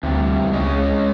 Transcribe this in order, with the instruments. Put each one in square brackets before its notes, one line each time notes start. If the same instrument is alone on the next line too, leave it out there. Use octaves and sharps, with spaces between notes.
[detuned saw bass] D2 [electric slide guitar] C3 E3 G3
[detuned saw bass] C#2 [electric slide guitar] G#3 C#4 D#5